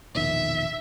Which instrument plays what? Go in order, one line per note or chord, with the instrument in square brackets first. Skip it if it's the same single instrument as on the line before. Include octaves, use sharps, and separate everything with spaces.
[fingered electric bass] E1 A#1 D#3 [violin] E5